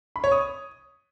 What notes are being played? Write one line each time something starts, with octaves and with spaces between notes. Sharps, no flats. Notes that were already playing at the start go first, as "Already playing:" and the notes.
B5
C#5
D#6